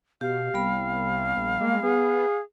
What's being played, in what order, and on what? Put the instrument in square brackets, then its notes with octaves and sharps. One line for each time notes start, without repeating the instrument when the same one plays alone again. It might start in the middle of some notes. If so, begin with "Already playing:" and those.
[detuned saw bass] B2 [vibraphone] G4 [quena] F5
[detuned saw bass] C2 [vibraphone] G3 B3 B5
[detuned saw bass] A#1
[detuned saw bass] G#3 [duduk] A#3
[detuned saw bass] B3 [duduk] G#4